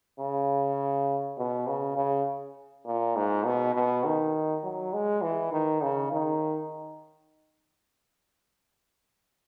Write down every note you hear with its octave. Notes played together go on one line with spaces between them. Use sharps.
C#3
B2
C#3
C#3
A#2
G#2
B2
B2
D#3
F#3
G#3
E3
D#3
C#3
D#3